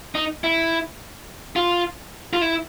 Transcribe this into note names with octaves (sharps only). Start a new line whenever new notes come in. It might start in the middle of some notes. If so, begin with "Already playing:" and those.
D#4
E4
F4
F4
E4